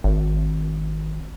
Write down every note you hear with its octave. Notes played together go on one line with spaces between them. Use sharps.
G#1